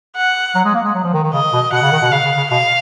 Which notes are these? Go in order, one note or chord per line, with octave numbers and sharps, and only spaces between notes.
F#5
F#3
G#3
A#3
G#3
F#3
F3
D#3
D#3
C#3 D#5
B2
B2 F#5
C#3
D#3
B2
C#3 F5
C#3
C#3
B2 F5